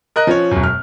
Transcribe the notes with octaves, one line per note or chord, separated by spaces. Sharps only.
A#4 D#5 F#6
F3 C#4 C#5
E1 F#2
F6